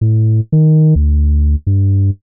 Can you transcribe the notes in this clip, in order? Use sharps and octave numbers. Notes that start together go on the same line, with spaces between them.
A2
D#3
D2
G2